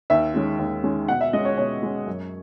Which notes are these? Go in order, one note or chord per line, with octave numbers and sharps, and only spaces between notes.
D#2 E5
D#3 G#3 C#4
D#2
D#3 G#3 C#4
B2 F#5
E5
G#3 C#4 D#5
C#5
B2 C#5
G#3 C#4
F#2